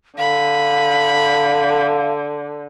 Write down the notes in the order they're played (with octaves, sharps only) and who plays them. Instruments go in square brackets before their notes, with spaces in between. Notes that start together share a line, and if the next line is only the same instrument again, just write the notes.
[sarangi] D3 [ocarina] F5 [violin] B5